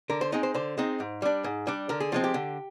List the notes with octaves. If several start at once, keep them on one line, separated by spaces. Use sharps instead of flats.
D3 A#4
C5
G#3 C4 D#4 D#5
C5
D3 C5
G#3 C4 D#4
G#2
G3 D4
G#2
G3 D4
D3 A#4
G#4
F3 G#3 C4 F4
G4
D3